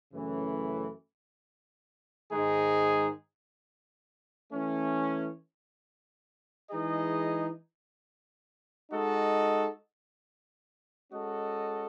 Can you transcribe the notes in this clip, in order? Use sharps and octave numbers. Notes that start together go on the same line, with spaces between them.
F#2 C#3 E3 A3 C#4
G#2 D#3 G#3 D#4 G#4
E3 A3 C#4
E3 G#3 D#4 G#4 D#5
G#3 D#4 F#4 A4 D#5
G#3 C#4 F#4 A4 D#5